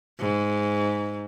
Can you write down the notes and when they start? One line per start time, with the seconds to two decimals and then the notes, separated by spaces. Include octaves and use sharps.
0.19 G#2